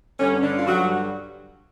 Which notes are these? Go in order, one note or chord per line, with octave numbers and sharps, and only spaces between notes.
G2 D3 G3 C#4
C#4
D3 D4
F4
G2 D3 F#3 G3 F#4